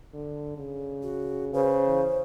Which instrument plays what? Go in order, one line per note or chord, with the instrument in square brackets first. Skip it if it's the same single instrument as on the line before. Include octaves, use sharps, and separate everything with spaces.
[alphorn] D3
C#3
[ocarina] F#4
[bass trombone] C#3 [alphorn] B4 [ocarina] C5
[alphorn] E3